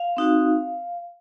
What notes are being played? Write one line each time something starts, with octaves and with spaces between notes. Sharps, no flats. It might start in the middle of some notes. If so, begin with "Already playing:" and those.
Already playing: F5
C4 D#4 F#4